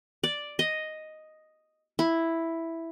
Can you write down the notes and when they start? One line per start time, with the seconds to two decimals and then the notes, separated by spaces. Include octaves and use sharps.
0.24 D5
0.59 D#5
1.99 E4